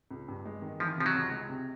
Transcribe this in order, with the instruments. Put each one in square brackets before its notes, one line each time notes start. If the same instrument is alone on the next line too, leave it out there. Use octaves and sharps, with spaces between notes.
[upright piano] C#2
G2
G#3
D#3
[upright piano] E3 [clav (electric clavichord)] F3
[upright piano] C3 [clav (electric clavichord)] F3
[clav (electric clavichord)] F#3
[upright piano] C#2
G#3
C3